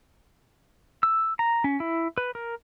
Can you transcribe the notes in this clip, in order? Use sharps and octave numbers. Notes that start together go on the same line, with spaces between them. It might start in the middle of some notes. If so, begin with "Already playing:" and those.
E6
A#5
C#4
E4
B4
A#4